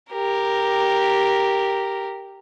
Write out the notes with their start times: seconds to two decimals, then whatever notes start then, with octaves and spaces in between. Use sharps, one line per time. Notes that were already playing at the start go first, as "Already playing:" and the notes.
0.12 G4 A#4